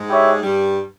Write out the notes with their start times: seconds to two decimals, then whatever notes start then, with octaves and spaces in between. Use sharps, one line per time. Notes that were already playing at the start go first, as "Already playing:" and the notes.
Already playing: G#2 G#3
0.08 E4 G4 C#5 E5
0.43 G2 G3